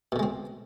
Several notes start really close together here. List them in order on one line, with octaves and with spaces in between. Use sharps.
B2 D3 G#3 C4